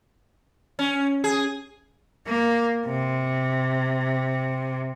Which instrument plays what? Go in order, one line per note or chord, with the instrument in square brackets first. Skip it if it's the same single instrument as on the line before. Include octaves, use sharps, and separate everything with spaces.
[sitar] C#4
G#4
[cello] A#3
C3